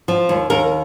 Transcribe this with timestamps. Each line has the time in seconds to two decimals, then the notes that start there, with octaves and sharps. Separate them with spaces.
0.08 F3
0.29 D#2
0.50 D#2 A#4